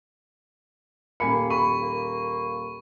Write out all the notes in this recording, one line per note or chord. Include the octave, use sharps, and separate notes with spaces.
D#1 A#3 G#5 B5 C#7
B5 C#6
A#3